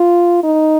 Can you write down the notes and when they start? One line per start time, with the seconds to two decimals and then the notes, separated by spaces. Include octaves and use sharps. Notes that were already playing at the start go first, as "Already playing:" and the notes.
Already playing: F4
0.44 D#4